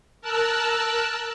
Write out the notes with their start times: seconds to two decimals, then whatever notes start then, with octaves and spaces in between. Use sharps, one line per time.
0.21 A#4 A5 E6 F#6